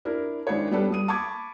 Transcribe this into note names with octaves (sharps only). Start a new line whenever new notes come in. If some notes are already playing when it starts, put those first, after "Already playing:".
D4 E4 A#4
D#3 G#3 D4 E4 C5 C#5
G3 B3 D4 G4 A4 B4
G3 D#6 D#7
A5 B5 C#6 D6 G#6